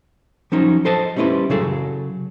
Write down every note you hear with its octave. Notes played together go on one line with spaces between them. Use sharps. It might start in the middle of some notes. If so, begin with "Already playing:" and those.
F3 F#3 C#4 D#4
A4 C5 D#5 A5
G3 A3 C#4 E4 B4 C5
C#3 F#3 G#4 A4